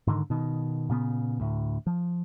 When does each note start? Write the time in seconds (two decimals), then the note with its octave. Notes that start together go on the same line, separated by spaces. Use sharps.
0.07 G#2 D3 D#3
0.30 B2 D#3
0.90 A#2 C#3 B3
1.40 D2 A2
1.87 F3